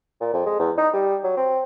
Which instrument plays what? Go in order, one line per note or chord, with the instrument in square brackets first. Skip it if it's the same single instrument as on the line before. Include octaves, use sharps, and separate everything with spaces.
[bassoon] A#2
F2
G#3
E2
D#4
G3
F#3
C4